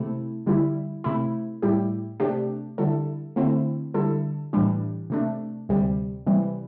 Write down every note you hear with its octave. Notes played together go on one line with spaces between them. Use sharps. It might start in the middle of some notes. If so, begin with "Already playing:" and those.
Already playing: C3 A3 E4
D3 G3 E4
C3 A3 E4
A2 G3 E4 G4
C3 A3 D4 G4
D3 G3 E4 A4
D3 A3 C4 E4
D3 G3 E4 A4
A2 E3 G3 D4
C3 A3 D4
D2 C3 G3
C3 E3 G3